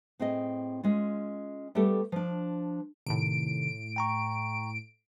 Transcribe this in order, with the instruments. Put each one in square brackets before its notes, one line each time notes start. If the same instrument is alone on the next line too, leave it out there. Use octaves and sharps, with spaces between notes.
[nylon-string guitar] A2 C4 G#4 D#5
G#3 C#4 F4
G3 A3 B3 G4 A4
F3 D4
[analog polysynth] A2 D7 [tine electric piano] C3 D#3
[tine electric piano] G5 A#5 C#6